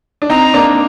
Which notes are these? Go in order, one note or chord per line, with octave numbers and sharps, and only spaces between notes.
D4
C4 D#4 A#5
A#3 D4